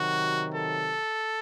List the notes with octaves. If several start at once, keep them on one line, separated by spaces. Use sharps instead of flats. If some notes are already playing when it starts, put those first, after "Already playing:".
Already playing: C3 D#3 F#3 F#4
A4